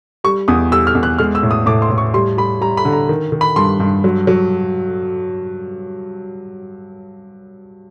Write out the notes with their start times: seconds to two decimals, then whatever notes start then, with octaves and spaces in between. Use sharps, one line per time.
0.24 G3 C#6
0.48 E2 D#6
0.71 G3 E6
0.87 F6
0.95 E2
1.03 F#6
1.19 G#3 F6
1.35 E6
1.43 A2
1.51 D#6
1.66 A2 D6
1.82 C6
1.91 A2
1.98 C#6
2.14 G3 C6
2.37 G3 B5
2.61 G3 A#5
2.77 B5
2.85 D3
2.92 A#5
3.09 D#3
3.32 D#3
3.41 B5
3.56 G2 C6
3.80 G2
4.04 F#3
4.27 F#3